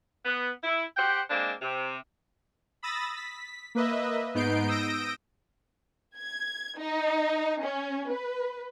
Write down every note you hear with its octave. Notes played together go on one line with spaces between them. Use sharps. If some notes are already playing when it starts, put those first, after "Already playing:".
B3
E4
G4 C5 F#5 G5
G#3 A#3 C4 D4
C3
B5 D#6 E6 A6 A#6
B6
A#3 B4 D#5 E5
G#2 B3 D#4 G6 C7 D7
D#6 E6 G6 A#6 D7
G#6
D#4
C#4
B4